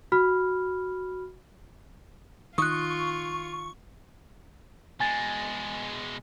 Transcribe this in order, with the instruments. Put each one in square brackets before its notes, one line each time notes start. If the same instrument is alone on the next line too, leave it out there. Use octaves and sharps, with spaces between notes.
[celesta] F#4 B5 F6
[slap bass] D#3 [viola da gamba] F4 [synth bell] C#6 [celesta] D#6 F#6
[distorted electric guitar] B2 G#3 [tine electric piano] G#5 A6